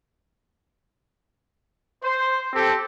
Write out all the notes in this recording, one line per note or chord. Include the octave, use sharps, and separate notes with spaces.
C5
C4 G4 A4